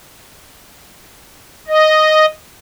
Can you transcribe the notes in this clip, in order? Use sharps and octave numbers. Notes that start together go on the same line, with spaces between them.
D#5